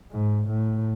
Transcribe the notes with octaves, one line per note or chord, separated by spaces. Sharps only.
G#2
A2